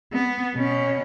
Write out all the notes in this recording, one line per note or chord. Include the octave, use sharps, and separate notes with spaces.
B3
B2 C#4